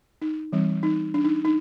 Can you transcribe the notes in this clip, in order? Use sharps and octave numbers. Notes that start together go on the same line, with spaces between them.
D#4
E3 G3 C4
D#4
D4
D#4
D#4